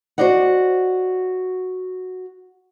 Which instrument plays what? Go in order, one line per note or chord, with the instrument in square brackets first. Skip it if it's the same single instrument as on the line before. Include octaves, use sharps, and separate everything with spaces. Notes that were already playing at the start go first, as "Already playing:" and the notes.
[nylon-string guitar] F#4 G#4 C5 D5 D#5 F#5